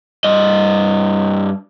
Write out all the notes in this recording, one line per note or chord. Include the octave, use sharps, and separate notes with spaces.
G2 D#5